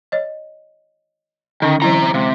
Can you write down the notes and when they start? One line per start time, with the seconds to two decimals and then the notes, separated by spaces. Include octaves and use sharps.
0.12 C#5 D#5
1.62 D3 D#3 C#4
1.82 C3 E3 F#3 E4 A#5
2.14 C3 G#3